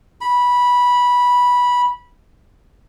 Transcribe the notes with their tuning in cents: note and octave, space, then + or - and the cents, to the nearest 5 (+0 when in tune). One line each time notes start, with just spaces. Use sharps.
B5 -15